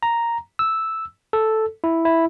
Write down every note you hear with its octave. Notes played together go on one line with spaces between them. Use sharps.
A#5
E6
A4
E4
E4